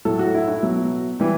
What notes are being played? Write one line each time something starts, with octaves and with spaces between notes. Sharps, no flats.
A2 F#3 A4
F#4
E4
E4
B2 F#3
E3 G3